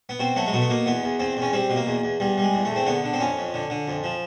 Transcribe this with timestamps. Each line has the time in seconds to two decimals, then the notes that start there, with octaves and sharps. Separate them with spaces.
0.09 B3
0.20 B2 C4
0.36 F#3 A3
0.46 G#3
0.53 B2 A3
0.62 B3
0.70 B2 A#3
0.86 E2 B3
1.03 E2
1.19 E2 C4
1.37 E2 C#4
1.53 G3 C4
1.70 B2
1.76 A#3
1.87 E2
2.03 E2
2.20 E2 G3
2.38 G3 G#3
2.54 E2
2.65 A3
2.70 E2
2.76 C4
2.87 D3 B3
3.04 D3
3.14 C4
3.20 F2 C#4
3.37 F2
3.54 D3
3.70 D3
3.88 F2
4.04 F3